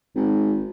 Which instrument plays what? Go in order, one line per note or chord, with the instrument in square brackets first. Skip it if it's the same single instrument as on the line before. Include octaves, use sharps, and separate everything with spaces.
[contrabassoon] G#1